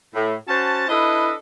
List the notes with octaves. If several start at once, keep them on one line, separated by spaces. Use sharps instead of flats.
A2
C#4 F#4 C5 A5
D4 E4 A4 B4 D#5